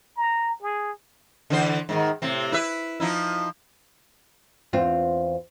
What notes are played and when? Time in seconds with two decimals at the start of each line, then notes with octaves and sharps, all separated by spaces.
0.17 A#5
0.62 G#4
1.50 D3 E3 C5
1.89 G#2 D3 D#3
2.22 A2 C3 C4
2.52 E4 B4 E5
3.00 F3 D#4 E4
4.73 E2 C4 F4